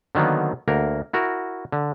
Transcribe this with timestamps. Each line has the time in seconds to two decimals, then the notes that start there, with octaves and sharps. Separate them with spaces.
0.15 D3 D#3 F#3 A#3 B3
0.68 D2 A#3 A#4 F#5
1.13 E4 F#4 A#4
1.72 D3